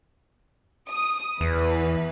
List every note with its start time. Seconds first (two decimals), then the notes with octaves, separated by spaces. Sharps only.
0.89 D#6
1.41 E2 E3 B4